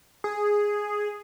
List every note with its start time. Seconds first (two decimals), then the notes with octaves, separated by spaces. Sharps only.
0.24 G#4